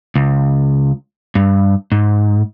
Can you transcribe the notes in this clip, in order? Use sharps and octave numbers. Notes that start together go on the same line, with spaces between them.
C#2
G2
G#2